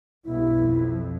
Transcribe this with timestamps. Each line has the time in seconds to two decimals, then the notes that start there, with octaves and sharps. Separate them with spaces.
0.25 B1 G2 E4
0.59 F2